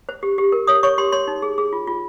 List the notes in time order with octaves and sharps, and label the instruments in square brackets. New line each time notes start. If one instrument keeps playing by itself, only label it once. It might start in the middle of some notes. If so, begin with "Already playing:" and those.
[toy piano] C5
G4
G4
A#4
C#5 D#6
C#5 C#6
G4 C6
C#5 C6
D#4
G#4
G#4
F4
F4